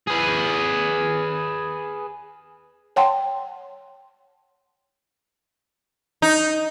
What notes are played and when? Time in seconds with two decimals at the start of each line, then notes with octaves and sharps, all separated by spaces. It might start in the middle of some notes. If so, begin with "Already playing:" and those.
0.07 G#4 B4
2.96 C#5 F#5 G5 A5 C6
6.22 D#4